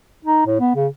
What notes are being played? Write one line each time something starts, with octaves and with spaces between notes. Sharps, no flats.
D#4
A2
B3
C#3